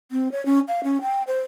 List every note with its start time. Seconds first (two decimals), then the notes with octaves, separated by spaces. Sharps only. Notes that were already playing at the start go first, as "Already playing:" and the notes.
0.11 C4
0.32 C#5
0.45 C#4
0.68 F5
0.84 C#4
1.01 G5
1.27 C5